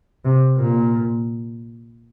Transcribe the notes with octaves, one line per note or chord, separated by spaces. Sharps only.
C3
A#2